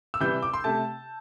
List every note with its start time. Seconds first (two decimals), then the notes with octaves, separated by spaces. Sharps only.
0.14 E6
0.20 C3 E3 G3 G6
0.42 D6
0.54 C6
0.64 C3 A3 A5